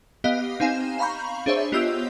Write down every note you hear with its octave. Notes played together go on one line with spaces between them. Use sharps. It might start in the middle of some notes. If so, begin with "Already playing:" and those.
B3 G4 D#5 F5
C4 D#4 F5 G#5 E7
F5 A#5 B5 C#6 G6
D4 G#4 C5 C#5 E5
B3 F4 G4 D#5 E6 G6